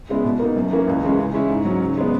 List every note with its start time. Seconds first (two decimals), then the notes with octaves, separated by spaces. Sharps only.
0.09 C#3 G#3 B3 E4
0.24 B2
0.40 A#3 D#4
0.56 F#2
0.71 E3 A#3 C#4
0.88 C#2
1.03 C#3 E3 G#3 C#4
1.19 C#3
1.34 G#3 C#4 E4
1.50 G#2
1.65 F#3 C#4
1.80 C#3
1.97 G#3 B3